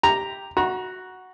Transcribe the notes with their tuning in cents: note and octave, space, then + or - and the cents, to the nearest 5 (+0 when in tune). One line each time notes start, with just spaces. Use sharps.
G4 +0 A#5 -5
F#4 +0 A#5 +30 C#6 -40